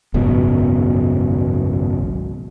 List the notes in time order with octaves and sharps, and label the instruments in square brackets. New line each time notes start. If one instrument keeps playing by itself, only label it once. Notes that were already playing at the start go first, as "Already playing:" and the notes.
[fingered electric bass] G#1 C#2 F#2 B2